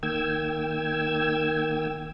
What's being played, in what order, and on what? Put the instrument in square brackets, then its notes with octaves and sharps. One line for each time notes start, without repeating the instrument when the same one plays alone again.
[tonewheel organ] D#3 A#3 G5 E6 G#6